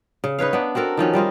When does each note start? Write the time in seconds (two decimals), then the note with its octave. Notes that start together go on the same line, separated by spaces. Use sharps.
0.24 C#3
0.39 D#4 B4 C#5 F5
0.53 B3 D4
0.75 C4 F#4 A4 A#4
0.97 D#3 F3 C#4 F#4
1.13 G3 C4 F4 D#5